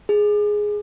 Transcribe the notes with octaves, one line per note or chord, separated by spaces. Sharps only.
G#4